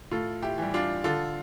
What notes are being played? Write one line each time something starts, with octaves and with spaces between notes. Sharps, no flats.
A2 F4 A4
E4 G4
E3 G3
D4 F4
D3 F4 A4